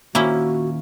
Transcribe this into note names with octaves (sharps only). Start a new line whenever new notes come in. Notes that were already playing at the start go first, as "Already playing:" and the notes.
D#2 A#2 A#3 C#4 E4 F#4